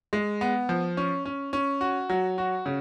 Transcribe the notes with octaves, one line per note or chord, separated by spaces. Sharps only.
G#3
B3
F3
C#4
C#4
C#4
F#4
F#3
F#4
C#3